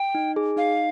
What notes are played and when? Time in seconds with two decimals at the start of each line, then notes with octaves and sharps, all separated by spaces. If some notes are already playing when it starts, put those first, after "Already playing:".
Already playing: G5
0.15 D#4
0.36 G#4
0.57 D#4 F5